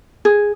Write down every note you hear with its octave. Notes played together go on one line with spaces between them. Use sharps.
G#4